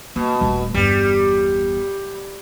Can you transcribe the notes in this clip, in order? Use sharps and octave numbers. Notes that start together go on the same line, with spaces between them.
B2 A#3
D#1 A3
G1 E2 G3